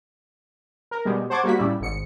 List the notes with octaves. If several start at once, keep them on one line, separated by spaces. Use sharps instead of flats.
A#4
B2 G3 G#3
C5 F#5 A5 C#6 D6 G#6
G3 A#3 F#4 B6
A2 C#3 G3 E4
G#1 G#2 C#7